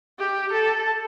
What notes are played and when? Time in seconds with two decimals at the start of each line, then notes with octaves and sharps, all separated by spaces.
0.19 G4
0.53 A4